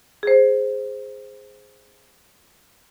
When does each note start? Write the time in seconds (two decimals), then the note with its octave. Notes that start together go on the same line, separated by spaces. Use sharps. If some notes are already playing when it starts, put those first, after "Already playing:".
0.23 G#4 C5